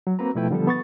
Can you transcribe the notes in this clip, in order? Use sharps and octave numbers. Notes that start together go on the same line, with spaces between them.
F#3
A#3 C4 F#4 B4 A#5
B2 F3 A3 E4 B4 G5
D3 F3 G3 B3 A4
B3 C#6 A6